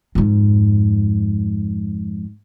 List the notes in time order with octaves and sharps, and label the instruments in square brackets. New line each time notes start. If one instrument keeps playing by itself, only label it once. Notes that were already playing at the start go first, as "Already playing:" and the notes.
[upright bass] F2 G#2